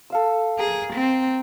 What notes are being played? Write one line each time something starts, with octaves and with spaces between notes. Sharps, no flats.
A4 F5 E6
G#4 A#4
C4